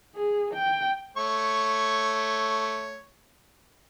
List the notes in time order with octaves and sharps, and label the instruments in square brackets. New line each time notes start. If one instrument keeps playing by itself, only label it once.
[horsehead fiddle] G#4
G5
[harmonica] A3 C#5 C#6